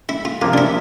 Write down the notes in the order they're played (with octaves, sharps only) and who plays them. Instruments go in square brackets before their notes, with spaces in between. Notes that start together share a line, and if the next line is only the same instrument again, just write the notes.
[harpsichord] E4
F4
[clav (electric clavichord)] C3 F3 A#3 [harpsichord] F4
[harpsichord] D4
E4